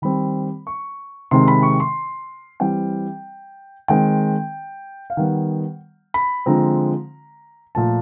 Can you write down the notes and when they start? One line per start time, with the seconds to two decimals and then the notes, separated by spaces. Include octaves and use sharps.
0.02 D#3 G3 C4 B5
0.67 C#6
1.31 C3 D#3 G#3 C4 C6
1.48 B5
1.63 C#6
1.80 C6
2.60 E3 G3 C4 G5
3.88 D#3 G#3 C4 G5
5.10 F5
5.17 D#3 G3 B3 F#5
6.14 B5
6.46 D3 F3 G#3 C4 A#5
7.75 A#2 F3 A3 A5